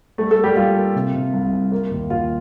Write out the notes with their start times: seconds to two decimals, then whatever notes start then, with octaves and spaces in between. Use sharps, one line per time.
0.18 G3 A3 A4
0.31 A3 A4
0.38 A#3
0.44 G3 G4
0.56 G3 F4
0.76 A#3
0.96 C3
1.14 C3
1.34 C2
1.53 C2
1.72 A#3
1.91 D#2
2.10 D#2 F4